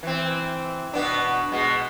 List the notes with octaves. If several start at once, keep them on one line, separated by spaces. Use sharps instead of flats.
E3 C4
B2 B3 D4
B2 G#3